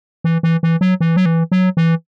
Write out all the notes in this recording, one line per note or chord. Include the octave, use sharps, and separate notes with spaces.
E3
E3
E3
F#3
E3
F#3
E3
F#3
E3